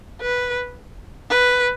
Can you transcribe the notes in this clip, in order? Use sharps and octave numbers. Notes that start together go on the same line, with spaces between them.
B4
B4